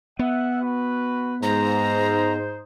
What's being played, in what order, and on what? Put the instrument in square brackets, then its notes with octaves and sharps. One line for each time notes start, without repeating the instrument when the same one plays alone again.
[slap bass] B3 [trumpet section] E5 F#5
[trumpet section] F#4 B4
[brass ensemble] G#2 [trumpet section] D#4 C5 [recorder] A#5